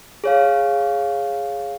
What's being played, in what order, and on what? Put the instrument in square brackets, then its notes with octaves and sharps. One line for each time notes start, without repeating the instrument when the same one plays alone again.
[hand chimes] G#4 C#5 F5